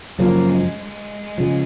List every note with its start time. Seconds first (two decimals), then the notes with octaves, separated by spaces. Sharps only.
0.18 F#2 C#3 F3 A#3
0.48 G#3
0.79 G#3
1.38 C#3 F3